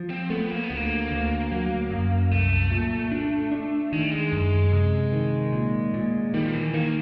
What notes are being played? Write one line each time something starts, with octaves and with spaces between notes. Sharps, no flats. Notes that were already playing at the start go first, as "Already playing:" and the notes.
Already playing: F3
C4
A3 B3
A#3
B3
D2
A#3
D2
F#3
F#2
C2 A3
A#2
D4
D4
D#3 G#3
G3
G#3
F#2
C3
D#3
A#2
A#2
D#3 G3
F3
E3
D#3 A#3